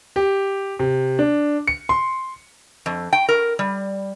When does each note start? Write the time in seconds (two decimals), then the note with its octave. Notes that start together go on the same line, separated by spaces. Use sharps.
0.16 G4
0.79 C3
1.19 D4
1.68 C#7
1.89 C6
2.86 F2
3.13 G5
3.29 A#4
3.59 G3